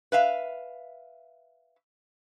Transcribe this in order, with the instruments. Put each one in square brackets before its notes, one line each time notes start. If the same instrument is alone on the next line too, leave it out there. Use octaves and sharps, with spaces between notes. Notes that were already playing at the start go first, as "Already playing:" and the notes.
[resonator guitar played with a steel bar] B4 E5 F5